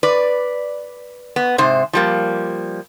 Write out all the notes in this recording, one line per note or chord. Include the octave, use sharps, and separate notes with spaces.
B4 D5
B3
G#2 C3 C5
F3 G3 A#3